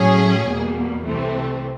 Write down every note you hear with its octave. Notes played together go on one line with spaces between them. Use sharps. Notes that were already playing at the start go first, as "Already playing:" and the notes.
Already playing: A2 F#3 A3 C#4 G#4
E2 B2 G3 A#3
C2 C3 E3 A3 C4